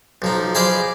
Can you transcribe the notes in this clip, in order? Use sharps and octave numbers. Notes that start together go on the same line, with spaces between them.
B1 F3 D#4
G#4 B4 C5 D5 D#5 F5